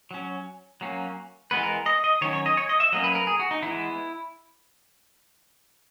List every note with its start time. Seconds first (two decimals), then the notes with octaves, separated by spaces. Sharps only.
0.11 F#3 C#4
0.81 F#3 A#3 C#4
1.51 E3 G#3 B3 B4
1.63 A#4
1.86 D#5
2.04 D#5
2.21 D#3 F#3 C#4 C#5
2.33 C#5
2.46 D#5
2.57 C#5
2.69 D#5
2.80 E5
2.92 F#3 A#3 C#4 D#5
3.04 B4
3.15 A#4
3.27 G#4
3.39 F#4
3.51 D#4
3.62 E3 G#3 B3 E4